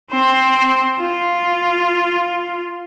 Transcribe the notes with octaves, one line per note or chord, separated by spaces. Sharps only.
C4 C5
F4